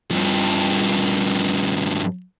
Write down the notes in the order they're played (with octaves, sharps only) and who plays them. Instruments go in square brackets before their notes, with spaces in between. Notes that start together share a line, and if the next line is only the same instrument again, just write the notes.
[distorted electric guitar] G2 F3